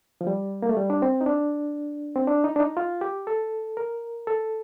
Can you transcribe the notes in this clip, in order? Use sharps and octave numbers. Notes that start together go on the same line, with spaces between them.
F3
G3
A#3
A3
G3
D4
C4
D#4
D4
C4
D4
D#4
D4
D#4
F4
G4
A4
A#4
A4